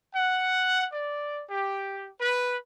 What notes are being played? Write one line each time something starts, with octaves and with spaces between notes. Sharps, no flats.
F#5
D5
G4
B4